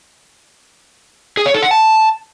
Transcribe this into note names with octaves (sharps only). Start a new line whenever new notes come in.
G#4
C#5
A4
F#5
A5